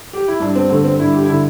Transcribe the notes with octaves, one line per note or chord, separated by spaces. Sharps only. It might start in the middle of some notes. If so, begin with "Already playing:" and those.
G4
E4
G2 D4
C4
D3 A3
C4
G2 E4
G4
D3 E4